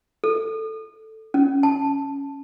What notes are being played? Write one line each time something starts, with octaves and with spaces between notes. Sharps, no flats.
A4
C#4
A5